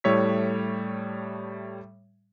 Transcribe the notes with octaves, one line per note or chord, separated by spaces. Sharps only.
A2 G3 A3 C#5 E6 B6